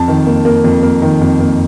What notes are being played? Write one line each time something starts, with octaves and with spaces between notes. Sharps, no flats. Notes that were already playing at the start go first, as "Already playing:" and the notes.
Already playing: F2 A5
D#3
A#3
A#3
F2
A#3
D#3
F2
A#3